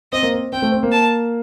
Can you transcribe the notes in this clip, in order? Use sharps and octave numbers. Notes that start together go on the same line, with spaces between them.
C4 D#5
A#3
C4
C4 G5
A3
C4
A#3
A5